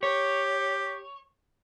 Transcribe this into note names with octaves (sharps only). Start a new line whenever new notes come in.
G4 C#5